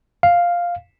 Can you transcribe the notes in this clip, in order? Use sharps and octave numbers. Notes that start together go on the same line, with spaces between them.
F5